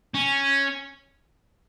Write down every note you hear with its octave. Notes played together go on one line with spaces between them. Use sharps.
C#4